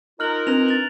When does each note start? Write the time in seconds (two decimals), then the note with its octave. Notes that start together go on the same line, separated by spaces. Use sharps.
0.20 D#4 F4 A#4 F6 F#6 F#7
0.47 C4 D4 B4 A#5 F7
0.66 A6 F7 F#7